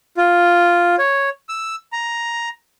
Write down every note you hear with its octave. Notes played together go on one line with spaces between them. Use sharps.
F4
C#5
E6
A#5